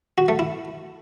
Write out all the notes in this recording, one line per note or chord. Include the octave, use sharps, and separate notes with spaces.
F#4
A3
E4